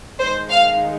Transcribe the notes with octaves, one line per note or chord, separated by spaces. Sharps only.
D#3 G#3 D#4 C5
F5